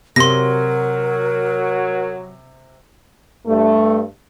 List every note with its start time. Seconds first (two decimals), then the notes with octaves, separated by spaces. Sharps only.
0.16 C3 F#3 A#4 C6 A#6
3.47 G2 A3